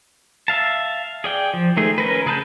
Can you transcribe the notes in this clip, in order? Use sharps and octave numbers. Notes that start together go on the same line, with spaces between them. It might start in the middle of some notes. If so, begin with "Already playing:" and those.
E5 F5 A5
G#4 D5 G5
F3
D#3 A3 G#4
C#4 A#4 B4
C#3 G#4 B4 A5 G6